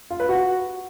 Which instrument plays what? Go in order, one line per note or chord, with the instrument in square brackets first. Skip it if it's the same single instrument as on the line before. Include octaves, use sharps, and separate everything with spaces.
[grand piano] F4
B4
F#4